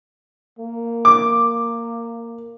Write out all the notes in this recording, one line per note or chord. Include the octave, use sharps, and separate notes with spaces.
A#3
D6